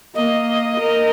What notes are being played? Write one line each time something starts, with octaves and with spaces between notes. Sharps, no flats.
A#3 D#5
A#4